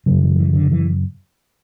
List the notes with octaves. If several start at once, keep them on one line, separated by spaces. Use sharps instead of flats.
F#2 C#3 F#3
E3
E3
D3
E3